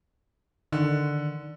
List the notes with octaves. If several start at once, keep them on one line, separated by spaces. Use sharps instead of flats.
D3 D#3